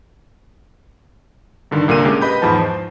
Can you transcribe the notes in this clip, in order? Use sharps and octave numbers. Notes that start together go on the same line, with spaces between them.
G2 D3 D#3
C2 A#2 D3 A#4 D#7
G#3 C#4 G4
B4 D#5 B5 G6
E2 G#2 F3 B3 A5
C5